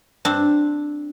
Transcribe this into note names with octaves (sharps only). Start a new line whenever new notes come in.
G2 C4 D4